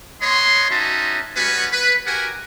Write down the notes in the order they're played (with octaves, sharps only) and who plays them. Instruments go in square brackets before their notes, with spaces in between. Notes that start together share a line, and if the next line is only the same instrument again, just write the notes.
[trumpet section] B3 C#5 D#5 C6
C#4 D#4 F#4 E5 A5
G3 B3 C#4 F#4 B4 G#5
B4
F#4 G4 A#4 F#5 G#5